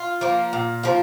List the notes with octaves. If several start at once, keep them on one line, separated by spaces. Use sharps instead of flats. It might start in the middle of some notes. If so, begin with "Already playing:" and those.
Already playing: F4
F3 A#3
A#2
F3 A#3